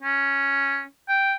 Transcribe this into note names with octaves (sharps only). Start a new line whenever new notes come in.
C#4
G5